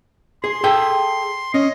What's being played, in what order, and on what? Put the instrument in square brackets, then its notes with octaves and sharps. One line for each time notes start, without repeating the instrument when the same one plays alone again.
[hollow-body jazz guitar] G#4 [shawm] C6
[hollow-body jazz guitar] G#4 A4 G5
[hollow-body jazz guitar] C#4 [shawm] D#5